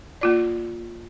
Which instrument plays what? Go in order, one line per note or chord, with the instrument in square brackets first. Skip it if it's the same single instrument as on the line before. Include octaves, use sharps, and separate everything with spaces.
[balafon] A#3 F4 D5